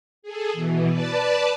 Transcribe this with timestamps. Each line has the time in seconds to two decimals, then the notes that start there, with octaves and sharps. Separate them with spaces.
0.22 G#4 A4
0.53 B2 E3
0.88 B4 D5 A5